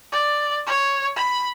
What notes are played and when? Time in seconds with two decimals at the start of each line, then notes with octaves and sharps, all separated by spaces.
0.12 D5
0.67 C#5
1.16 B5